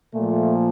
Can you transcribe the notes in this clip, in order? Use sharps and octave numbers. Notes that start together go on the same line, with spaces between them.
A#2 F3 A3